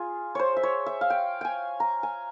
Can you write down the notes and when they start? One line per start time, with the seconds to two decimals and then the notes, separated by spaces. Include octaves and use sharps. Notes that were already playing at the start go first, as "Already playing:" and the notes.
Already playing: F4 G#4
0.35 C5 C#5
0.57 E5
0.63 C#5
0.86 E5
1.01 F5
1.10 G5
1.41 G5 G#5
1.80 A#5
2.03 G#5